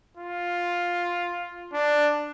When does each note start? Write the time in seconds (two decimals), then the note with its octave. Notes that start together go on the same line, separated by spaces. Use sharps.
0.17 F4
1.73 D4